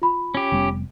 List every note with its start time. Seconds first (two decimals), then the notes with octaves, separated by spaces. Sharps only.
0.02 F4 B5
0.35 C#4 G4
0.52 F1 G3 B3